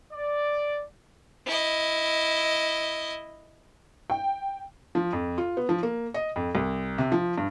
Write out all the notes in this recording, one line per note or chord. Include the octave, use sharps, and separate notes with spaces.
D5
E4 D#5
G5
F3
F2
F4
B3
F3
A#3
D#5
F2
C2
C3
F3
G2